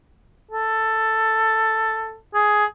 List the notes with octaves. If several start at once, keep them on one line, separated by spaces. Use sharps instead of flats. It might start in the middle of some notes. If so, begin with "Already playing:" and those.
A4
G#4